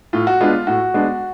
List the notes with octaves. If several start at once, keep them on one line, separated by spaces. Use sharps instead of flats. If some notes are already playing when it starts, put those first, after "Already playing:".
A2 F4
F#4
G#3 B3 D4 F4
A2 F#4
G#3 B3 D4